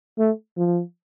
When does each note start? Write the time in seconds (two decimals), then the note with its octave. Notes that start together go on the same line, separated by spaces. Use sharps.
0.19 A3
0.57 F3